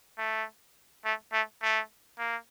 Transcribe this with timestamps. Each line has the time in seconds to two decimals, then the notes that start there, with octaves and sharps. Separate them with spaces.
0.18 A3
1.05 A3
1.33 A3
1.63 A3
2.19 A#3